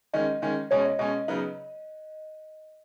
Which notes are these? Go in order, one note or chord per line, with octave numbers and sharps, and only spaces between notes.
D#3 G#3 C#4 D#5
D#3 G#3 C#4
B2 G#3 C#4 C#5
D#5
B2 G#3 C#4 D#5
C#3 F#3 B3 D#4